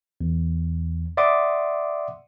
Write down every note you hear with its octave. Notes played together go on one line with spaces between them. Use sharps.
E2
D5 E5 F#5 C6 D6 D#6